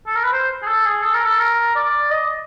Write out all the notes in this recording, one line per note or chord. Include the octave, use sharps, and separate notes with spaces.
A4
A#4
B4
C5
G#4
A4
G#4
A4
A#4
A4
A#4
D5
D#5